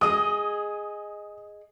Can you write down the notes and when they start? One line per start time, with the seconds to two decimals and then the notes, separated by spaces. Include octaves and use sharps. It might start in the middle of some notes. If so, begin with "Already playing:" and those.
0.01 G#4 D#5 D#6